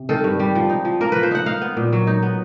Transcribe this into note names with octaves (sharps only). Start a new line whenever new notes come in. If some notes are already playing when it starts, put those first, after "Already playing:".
Already playing: C3
D#3 A4
G2
G3
F3
D#4
F3
A#3 A#4
F3 B4
C5
D#4 F#5
D#4 F5
B3
A#2
F#3
D#4
B3